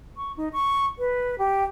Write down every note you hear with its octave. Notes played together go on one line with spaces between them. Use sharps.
C#6
D#4
C#6
B4
G4